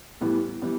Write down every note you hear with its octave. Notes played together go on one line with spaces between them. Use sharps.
A2 E3 G3 B3
E3 G3 B3